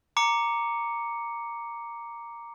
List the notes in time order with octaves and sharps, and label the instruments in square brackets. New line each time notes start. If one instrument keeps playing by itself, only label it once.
[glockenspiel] A#5 D6 C#7